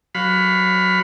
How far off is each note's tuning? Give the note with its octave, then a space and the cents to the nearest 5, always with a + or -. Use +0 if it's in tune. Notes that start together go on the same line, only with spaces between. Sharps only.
F#3 +0 F5 +15 B5 +15